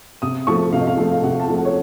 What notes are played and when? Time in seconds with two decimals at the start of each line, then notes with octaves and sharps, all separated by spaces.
0.22 C3 D#6
0.47 F3 A3 C#6
0.73 C3 F5
0.80 D#5
0.87 F5
0.97 F3 A3
1.11 F5
1.23 C3 F#5
1.40 A5
1.48 F3 A3
1.57 F#5
1.65 C#5